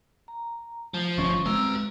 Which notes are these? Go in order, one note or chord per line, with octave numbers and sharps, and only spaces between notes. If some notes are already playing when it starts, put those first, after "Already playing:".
A#5
F3 A3
G1 G2 C#4 C#6
G#3 A3 C4 B4 A#5 E6